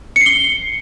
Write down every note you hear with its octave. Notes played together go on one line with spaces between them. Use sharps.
C#7
C7
G7